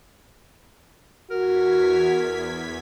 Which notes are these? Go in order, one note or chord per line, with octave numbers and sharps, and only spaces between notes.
E2 F#4 A#4 G#6 B6